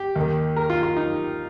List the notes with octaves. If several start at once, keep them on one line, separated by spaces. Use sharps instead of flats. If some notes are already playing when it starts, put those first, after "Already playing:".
Already playing: G4
D#2 D#3
A#4
F4
F4
D#4